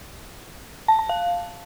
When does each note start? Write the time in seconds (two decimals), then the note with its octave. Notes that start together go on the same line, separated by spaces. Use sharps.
0.88 A5
0.99 A5
1.09 F5